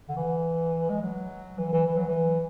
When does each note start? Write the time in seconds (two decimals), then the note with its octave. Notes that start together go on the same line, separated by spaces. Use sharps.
0.09 D3
0.16 E3
0.89 G#3
1.01 F#3
1.58 E3
1.73 E3
1.86 E3
1.97 F#3
2.08 E3